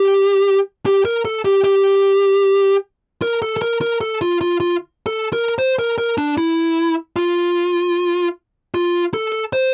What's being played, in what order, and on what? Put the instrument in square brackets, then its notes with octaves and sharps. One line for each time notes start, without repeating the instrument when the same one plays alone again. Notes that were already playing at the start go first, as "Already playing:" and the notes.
Already playing: [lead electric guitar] G4
G4
A#4
A4
G4
G4
A#4
A4
A4
A#4
A#4
A4
F4
F4
F4
A4
A#4
C5
A#4
A#4
D4
E4
F4
F4
A4
C5